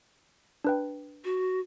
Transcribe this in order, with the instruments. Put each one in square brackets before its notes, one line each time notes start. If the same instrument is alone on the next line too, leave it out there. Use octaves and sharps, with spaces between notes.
[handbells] D4 B4 G5
[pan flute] F#4